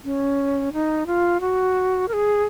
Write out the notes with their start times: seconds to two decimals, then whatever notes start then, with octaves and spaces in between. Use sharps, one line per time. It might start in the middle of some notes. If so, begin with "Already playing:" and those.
0.05 C#4
0.73 D#4
1.07 F4
1.41 F#4
2.08 A#4
2.13 G#4